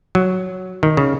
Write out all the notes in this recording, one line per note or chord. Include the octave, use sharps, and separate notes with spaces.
F#3
D#3
C#3